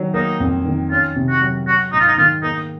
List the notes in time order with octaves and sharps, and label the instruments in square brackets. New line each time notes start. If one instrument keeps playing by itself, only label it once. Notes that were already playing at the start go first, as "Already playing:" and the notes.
Already playing: [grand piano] D#3 F#3
[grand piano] A#3 [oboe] D#4
[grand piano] F2
D#3
[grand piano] C#4 [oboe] F4
[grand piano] C3
[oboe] F#4
[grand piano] F#3
[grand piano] F#3 [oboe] F#4
[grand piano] G#2 [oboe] D#4
[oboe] F4
D#4
[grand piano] D#3 [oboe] F4
[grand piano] A#3 [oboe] D#4